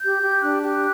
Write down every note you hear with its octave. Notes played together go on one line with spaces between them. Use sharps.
G4 G6
G4
D4 F#6
G4